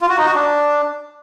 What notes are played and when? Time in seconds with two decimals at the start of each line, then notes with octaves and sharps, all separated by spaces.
0.01 F4
0.09 F#4
0.18 D#4
0.26 F#4
0.35 D4